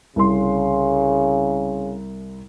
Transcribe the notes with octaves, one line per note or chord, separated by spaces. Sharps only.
C2 C#3 C6